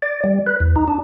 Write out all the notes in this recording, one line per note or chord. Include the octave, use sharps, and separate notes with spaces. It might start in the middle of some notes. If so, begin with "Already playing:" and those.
D5
G3
B4
E2
D#4
D4